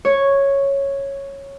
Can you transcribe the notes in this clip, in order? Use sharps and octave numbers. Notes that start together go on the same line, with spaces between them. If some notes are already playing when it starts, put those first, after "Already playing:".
C#5